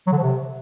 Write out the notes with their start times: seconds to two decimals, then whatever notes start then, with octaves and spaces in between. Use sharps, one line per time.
0.07 F#3
0.13 D3
0.18 F3
0.23 C3